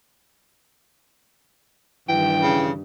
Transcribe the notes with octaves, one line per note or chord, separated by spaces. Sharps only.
G2 D#3 E3 G3 G5
C#3